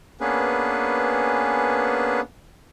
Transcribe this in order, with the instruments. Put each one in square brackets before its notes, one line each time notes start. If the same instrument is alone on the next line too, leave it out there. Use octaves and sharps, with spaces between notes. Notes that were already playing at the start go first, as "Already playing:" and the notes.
[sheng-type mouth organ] A#3 B3 C#4 D4 G#4 B4